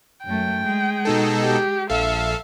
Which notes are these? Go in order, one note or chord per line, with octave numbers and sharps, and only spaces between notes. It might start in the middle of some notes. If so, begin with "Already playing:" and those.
F#2 A3 G5
G#3 G#4
B2 D#4 A4
G4
A#1 A4 E5 F5